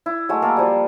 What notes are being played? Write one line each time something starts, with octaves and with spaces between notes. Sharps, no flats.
E4
F#3 G#3 A3
A#3 A4 A#4 C6
F3 G3